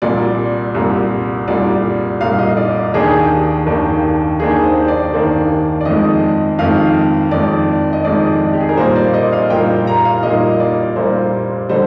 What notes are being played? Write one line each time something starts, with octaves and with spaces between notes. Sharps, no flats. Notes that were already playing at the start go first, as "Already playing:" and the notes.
C2 A#2 G3 D5
C2 A#2 G3
C2 A#2 G3 D5
C2 A#2 G3 F5
F5
D#5
D5
D#2 D#3 A#3 D4 G#4
G4
G#4
D#2 D#3 A#3 D4
D#2 D#3 A#3 D4 G#4
C5
D5
D#2 D#3 A#3 D4
D5
F2 D#3 G#3 D#5
F2 D#3 G#3 F5
F2 D#3 G#3 D5
D#5
F2 D#3 G#3 D5
G4
G#4
A#4
A#2 G3 A#3 C5
D5
D#5
F5
A#2 G3 A#3 G5
A#5
F5
A#2 G3 A#3 D#5
D5
A#2 G3 A#3 C5
D3 G3 C5